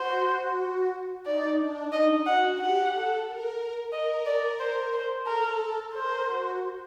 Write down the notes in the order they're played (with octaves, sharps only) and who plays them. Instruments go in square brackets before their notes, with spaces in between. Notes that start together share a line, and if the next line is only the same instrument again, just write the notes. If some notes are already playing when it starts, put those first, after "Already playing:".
Already playing: [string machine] F#4 [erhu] C5
[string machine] D#4 [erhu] D5
[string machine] D4
[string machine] D#4 [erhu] D#5
[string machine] F#4 [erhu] F#5
[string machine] G4 [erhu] F#5
[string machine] A4
A#4
[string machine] A#4 [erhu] D#5
[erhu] D5
C5
C5
[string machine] A4 [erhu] A#4
[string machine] A#4 [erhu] C5
[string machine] F#4